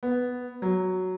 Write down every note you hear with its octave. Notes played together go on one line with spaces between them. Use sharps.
B3
F#3